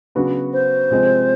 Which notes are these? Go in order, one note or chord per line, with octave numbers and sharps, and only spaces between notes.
C#3 F#3 B3 D4 F#4
C5
C3 F3 G#3 C4